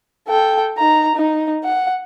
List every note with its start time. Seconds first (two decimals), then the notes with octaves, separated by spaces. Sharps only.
0.28 A4 G5
0.78 D#4 A#5
1.15 D#4
1.64 F#5